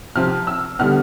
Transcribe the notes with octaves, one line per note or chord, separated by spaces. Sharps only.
C3 F3 C4 F6
E6
D3 G3 B3 F6